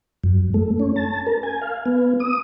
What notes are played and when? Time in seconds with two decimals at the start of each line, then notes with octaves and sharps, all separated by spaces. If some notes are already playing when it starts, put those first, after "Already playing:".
0.24 F#2
0.54 A3
0.79 C#4
0.96 A5
1.27 A#4
1.43 G#5
1.61 F5
1.86 B3
2.20 D#6